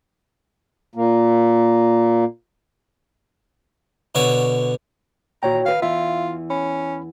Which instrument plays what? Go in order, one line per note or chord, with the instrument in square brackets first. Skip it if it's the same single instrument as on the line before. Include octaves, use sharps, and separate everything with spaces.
[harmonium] A#2 A#3
[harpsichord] B2 D3 C#5 C#6
[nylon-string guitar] A#2 D#3 E3 [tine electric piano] F#4 C#5 G5 [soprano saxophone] A#5
[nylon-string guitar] D#3 B4 [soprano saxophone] F5
[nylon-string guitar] E2 E3 [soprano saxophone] F4 [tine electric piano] E5 F5
[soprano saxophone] C#4 [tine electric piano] B5